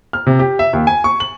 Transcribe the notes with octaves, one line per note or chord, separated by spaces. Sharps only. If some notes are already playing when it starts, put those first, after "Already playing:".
F6
C3
G4
E5
D#2
G#5
C#6
F#7